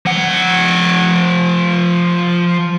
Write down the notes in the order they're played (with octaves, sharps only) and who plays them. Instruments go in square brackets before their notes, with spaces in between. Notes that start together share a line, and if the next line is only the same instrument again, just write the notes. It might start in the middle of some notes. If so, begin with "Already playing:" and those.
[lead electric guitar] F3 F#5